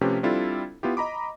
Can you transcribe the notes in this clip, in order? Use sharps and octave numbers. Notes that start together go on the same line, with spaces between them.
C3 F3 A3 C#4 G4 B4
G3 C4 D4 E4 F4 A4
B3 E4 F4 G4
D#5 A#5 B5 D6